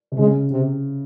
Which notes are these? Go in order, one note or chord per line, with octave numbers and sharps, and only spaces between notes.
C3
C#3 G#3
C3